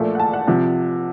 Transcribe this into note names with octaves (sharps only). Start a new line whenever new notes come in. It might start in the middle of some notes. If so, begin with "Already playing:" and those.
Already playing: A#1 A#2 A3
F#5
A5
F#5
C3 F3 F#5